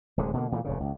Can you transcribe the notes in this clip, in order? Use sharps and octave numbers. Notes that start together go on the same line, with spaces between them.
D1 D#2 C3 G#3
B2 D3 A#3
A#2 E3 G#3 A3
F1 G#2 C#3
C#2